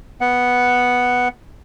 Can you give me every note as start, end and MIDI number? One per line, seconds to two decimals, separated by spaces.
0.21 1.28 59
0.21 1.28 78